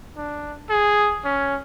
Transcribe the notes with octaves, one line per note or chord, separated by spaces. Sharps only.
D4
G#4
C#4